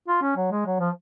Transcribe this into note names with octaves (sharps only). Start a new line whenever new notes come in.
F4
C#4
F#3
G#3
F#3
F3